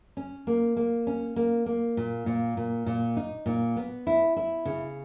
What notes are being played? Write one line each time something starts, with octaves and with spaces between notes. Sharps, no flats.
C#4
A#3
A#3
C#4
A#3
A#3
A#2
A#2
A#2
A#2
D#4
A#2
B3
E4
E4
C#3